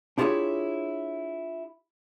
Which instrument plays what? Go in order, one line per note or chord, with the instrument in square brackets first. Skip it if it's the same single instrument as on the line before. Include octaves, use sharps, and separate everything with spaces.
[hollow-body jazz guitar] D4 E4 F4 G4 G#4 C#5